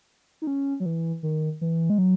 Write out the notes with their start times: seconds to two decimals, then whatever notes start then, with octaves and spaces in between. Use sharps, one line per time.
0.42 D#4
0.47 C#4
0.80 F#3
0.86 E3
1.23 D#3
1.61 E3
1.90 G#3
1.98 F#3